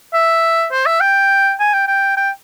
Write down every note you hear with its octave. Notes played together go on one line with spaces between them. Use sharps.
E5
C5
E5
G5
G#5
G5
G5
G5